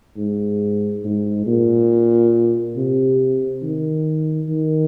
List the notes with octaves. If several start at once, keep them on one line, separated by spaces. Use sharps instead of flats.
G#2
G#2
A#2
C3
D#3
D#3